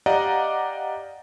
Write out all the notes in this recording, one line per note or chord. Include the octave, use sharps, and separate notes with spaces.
G4 D5 D#5 F5 F#5 A#5